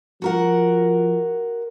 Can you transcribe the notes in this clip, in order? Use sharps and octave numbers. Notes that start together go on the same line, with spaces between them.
F3 F#4 A#4 F#5